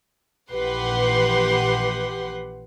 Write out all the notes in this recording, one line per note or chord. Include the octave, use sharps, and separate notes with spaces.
A#1 E3 G4 B4 F#5 C6